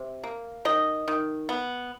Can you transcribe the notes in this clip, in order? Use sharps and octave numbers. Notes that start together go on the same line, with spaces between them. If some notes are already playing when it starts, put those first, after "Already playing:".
Already playing: C3
A#3
D#3 D#5
D#3
B3